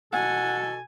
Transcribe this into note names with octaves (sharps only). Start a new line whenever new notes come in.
B2 A4 F#5 G#5